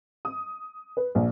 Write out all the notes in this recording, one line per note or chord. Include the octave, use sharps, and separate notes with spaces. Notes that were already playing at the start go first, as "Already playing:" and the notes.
D#6
B4
A#1